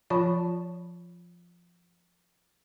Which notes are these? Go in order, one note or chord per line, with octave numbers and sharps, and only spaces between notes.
F3 F4 C#5 A5 B5 C#6